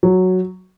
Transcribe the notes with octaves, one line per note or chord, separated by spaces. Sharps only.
F#3